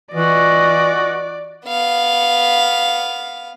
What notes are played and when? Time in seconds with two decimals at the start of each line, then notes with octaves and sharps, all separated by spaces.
0.14 E3 F4 F#4 D5 D#5
1.66 B3 F5